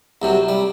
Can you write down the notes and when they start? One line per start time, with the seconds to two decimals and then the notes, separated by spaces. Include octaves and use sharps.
0.22 C2 C3 F#3
0.49 G3